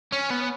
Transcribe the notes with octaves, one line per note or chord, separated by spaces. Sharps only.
C#4
B3